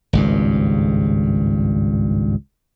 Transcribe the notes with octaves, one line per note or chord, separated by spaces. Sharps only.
G#1 C#2 G2